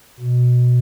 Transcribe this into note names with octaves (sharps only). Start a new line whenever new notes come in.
B2